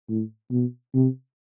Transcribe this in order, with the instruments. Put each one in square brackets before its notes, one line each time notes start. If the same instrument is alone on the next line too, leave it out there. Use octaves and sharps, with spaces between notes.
[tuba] A2
B2
C3